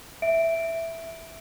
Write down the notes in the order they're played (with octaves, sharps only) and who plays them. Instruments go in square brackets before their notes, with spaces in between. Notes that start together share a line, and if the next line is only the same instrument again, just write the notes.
[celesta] E5 D7